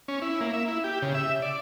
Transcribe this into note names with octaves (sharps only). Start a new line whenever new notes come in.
C#4
E4
A#3
E5
E4
G4
C#3
E5
D5